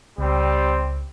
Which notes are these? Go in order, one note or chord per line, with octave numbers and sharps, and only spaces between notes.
C#2 G3 C4